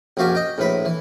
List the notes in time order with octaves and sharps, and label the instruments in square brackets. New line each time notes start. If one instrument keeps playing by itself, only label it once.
[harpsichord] A#1 F#2 F#4 G4 F5 G#5
D#5 G5
A#1 A2 B4 B5
E3